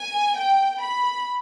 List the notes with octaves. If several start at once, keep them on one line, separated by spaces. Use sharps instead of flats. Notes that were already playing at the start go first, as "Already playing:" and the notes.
Already playing: G#5
G5
B5